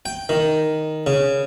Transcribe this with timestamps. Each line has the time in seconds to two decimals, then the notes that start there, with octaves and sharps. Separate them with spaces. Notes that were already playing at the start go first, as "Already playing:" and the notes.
0.06 G5
0.29 D#3
1.07 C#3